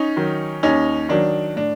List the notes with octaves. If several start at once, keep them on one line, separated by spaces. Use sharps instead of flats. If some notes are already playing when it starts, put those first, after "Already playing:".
Already playing: C#4 D#4
D#3 F#3
D#2 C#4 D#4
D#3 F#3 D4
A2 D4